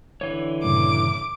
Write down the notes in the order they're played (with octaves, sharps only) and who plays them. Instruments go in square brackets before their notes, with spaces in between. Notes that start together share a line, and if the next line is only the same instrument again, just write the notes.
[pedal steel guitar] D3 E3 C#5
[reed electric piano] G2 A#2 C#3 [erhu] D6